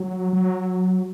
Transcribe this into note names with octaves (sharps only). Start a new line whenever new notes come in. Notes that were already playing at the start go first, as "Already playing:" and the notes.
Already playing: F#3
F#3